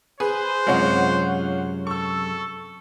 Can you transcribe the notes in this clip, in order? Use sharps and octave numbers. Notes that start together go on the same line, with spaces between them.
G#4 B4 C5
F#2 C3 G#3 F4 C#5 F#5
A4 C#6 E6